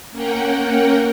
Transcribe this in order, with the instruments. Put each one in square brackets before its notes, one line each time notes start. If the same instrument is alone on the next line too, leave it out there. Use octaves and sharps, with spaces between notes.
[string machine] A#3 C#4 A#4 F#5 G5